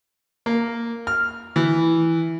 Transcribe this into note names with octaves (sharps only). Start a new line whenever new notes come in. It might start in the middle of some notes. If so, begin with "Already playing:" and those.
A#3
F6
E3